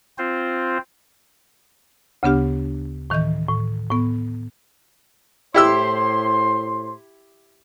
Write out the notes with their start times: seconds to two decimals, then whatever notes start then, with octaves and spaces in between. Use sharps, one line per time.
0.18 C4 F4 C5
2.23 D2 C#3 B3 D4 G4 F6
3.10 A2 D#3 E3 D#5 G6
3.48 A2
3.90 A2 B3
5.54 A2 E4 G4 C5 C6 E6